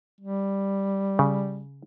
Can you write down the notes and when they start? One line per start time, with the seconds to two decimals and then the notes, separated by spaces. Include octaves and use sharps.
0.21 G3
1.19 C#3